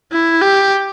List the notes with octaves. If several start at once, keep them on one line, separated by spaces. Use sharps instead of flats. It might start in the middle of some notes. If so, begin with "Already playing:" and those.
E4
G4